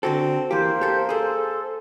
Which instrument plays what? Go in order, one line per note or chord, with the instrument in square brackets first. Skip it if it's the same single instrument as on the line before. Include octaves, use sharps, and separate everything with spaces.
[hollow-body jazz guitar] D3 F#4 A4 [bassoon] C4
[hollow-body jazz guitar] E3 G4 [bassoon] A#3 [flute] C5
[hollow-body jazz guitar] G4 A4
[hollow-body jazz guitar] G#4 C5 [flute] A4